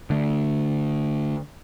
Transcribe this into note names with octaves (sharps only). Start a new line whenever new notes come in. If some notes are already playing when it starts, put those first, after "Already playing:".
D3 A3